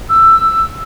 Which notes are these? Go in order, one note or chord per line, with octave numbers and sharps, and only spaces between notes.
E6